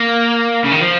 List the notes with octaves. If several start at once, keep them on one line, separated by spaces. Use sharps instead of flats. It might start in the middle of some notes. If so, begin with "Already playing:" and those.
Already playing: A#3
C#3
D#3
F3